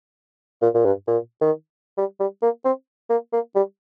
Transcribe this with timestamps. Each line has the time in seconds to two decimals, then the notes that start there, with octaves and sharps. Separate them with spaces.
0.62 A#2
0.74 A#2
0.85 G2
1.07 A#2
1.41 D#3
1.98 G3
2.20 G3
2.42 A#3
2.65 C4
3.10 A#3
3.33 A#3
3.55 G3